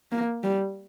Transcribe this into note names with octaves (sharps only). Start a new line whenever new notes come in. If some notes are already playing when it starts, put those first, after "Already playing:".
A#3
G3